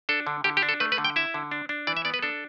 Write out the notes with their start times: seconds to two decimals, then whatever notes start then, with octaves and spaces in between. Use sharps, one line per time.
0.09 D4 A4
0.27 D3
0.44 D3 G4
0.57 G4
0.63 D4
0.69 A4
0.80 A3 B4
0.92 B4
0.98 D3
1.05 G5
1.16 E4 E5
1.34 D3
1.51 D4
1.69 D4
1.87 E3 D5
1.97 E5
2.05 B3 D5
2.14 B4
2.23 D4 A4